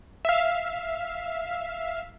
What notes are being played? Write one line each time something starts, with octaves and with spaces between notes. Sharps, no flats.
E5 F5